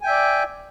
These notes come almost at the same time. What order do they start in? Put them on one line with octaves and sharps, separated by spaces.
G#5 G5 E5 D5